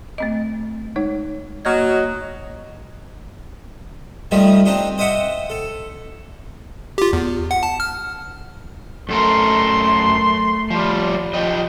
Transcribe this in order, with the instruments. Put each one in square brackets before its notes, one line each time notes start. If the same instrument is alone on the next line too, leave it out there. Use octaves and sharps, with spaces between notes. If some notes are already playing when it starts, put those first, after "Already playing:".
[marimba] A3 C4 D#5
G#3 D#4 C#5
[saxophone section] F#3 F#4 D#5 [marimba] A#3 F6 G#6
[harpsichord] D#3 F3 G3 A3 D#4
C4 D4 D#4 G4
C5 D#5 E5 F#5 D6
A4
[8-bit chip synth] F4 G4
E2
F#5
A5
F6
[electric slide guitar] F#2 A4 A#4 [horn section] A3 C6
[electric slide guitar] F3 G3
F3 G4 D#5